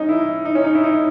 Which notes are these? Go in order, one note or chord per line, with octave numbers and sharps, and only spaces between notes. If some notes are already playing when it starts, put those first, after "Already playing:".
Already playing: C#4 D#4
E4
D#4
C#4
D#4
E4
D#4